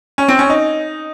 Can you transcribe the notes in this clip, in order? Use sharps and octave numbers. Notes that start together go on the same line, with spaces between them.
C#4
C4
C#4
D#4